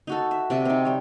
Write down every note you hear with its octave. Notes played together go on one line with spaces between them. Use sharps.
D#4 F#4 A4
E5
C3 D5 E5
C4 D#4
G3 C#5